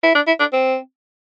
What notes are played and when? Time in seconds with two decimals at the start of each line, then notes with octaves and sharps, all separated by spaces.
0.03 E4
0.15 D4
0.27 E4
0.40 D4
0.53 C4